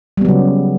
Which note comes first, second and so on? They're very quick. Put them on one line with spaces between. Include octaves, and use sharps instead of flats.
G3 B3 F#3 C#3